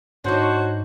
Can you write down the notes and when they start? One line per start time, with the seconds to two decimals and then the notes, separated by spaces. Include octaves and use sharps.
0.24 G#2 D4 D#4 F#4 C5 C#5